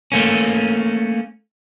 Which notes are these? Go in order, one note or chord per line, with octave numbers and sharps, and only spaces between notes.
A3 A#3 C#4